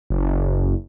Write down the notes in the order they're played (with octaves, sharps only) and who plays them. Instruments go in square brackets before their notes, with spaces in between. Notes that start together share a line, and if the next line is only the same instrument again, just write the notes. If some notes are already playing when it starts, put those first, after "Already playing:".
[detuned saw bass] F#1